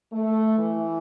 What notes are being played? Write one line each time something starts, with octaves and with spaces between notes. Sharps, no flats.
A3
E3